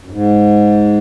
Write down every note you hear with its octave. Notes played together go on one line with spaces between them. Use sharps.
F#2
G#2